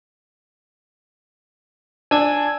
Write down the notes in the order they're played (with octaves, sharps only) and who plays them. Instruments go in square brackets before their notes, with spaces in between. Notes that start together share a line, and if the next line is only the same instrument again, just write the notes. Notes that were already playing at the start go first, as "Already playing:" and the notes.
[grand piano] D4 [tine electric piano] G#5 E6 G#6